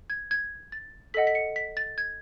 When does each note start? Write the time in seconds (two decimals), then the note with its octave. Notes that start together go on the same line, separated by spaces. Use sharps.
0.10 G#6
0.31 G#6
0.72 A6
1.14 A4 D#5 F#5 B6
1.27 B6
1.35 C#7
1.56 B6
1.77 A6
1.98 G#6